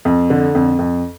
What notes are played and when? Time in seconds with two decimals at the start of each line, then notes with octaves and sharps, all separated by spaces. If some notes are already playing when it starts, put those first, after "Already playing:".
0.05 F2
0.30 D3
0.55 F2
0.79 F2